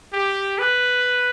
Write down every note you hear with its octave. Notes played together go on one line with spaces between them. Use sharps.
G4
B4